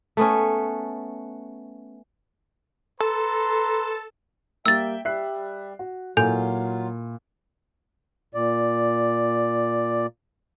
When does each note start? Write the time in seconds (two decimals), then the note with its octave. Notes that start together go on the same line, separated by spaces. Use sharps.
0.17 A3 B3 C#4
3.00 A4 B4 A#5 C6
4.66 G3 A#3 E5 G5 E6 A6
5.05 G3 E5 F#6 C7
5.79 F#4
6.17 A#2 F#3 E4 F4 A4 G#5 G6
8.34 A#2 D5